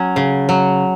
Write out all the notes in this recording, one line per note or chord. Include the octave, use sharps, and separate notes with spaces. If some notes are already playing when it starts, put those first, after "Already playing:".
Already playing: F#3 C#4
C#3
F#3